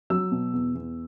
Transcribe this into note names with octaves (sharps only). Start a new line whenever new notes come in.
F#3 E6
B2
E2
E2